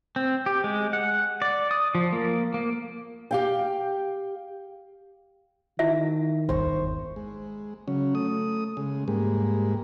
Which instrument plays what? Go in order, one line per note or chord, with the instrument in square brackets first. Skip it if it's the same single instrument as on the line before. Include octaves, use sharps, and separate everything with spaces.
[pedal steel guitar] C4
G4
G#3
F#5
D5
D#6
F3
A#3
A#3
[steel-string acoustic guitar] G4 F5 G5
[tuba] D#3 [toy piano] E4 E5
[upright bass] G1 E2 [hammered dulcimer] C5 C#6
[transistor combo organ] G#3
C#3 F#3 C#4
A3 D#6
C#3 G#3
G#2 G3 G#3 A#3